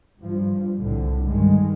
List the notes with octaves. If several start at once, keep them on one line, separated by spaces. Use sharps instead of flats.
G2 F3
C2 A2 D3
G2 D#3 G#3